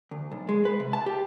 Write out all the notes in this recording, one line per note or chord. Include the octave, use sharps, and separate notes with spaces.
D2
B1
G#3
B4
C3
A5
G4